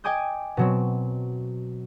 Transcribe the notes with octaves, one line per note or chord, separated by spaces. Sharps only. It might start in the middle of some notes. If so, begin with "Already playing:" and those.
D#5 G5 G#5 D6 D#6 G6
B2 F#3 C4